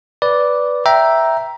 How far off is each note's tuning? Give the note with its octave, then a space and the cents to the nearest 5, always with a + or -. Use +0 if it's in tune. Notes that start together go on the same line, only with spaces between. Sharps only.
B4 +0 D5 -5
E5 +0 G5 -10 A#5 +10